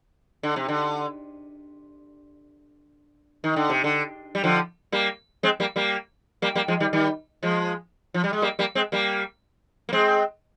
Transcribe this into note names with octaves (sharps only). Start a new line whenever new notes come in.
D3
C3
D3
D#3
D3
C3
D3
G3
D3 F3
G3 A#3
G#3 C4
G3 A#3
G3 A#3
G3 A#3
G3 A#3
F3 G#3
D#3 G3
D#3 G3
F3 G#3
F3
G3
G#3
G3 A#3
G3 A#3
G#3 C4
G3 A#3
A#3
G#3 C4